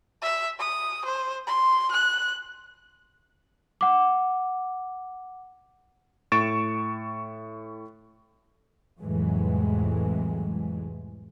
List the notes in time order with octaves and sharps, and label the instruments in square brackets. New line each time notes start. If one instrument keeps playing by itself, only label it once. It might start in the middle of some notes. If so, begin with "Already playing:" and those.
[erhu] E5
D#6
C5
C6
F#6
[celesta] F#5 D6
[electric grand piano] A2 C#6 A6 D7 E7
[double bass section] C2 F2 A2 E3 F#3 G#3